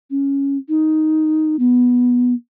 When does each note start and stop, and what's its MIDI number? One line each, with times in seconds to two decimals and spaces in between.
0.10 0.57 61
0.69 1.56 63
1.59 2.34 59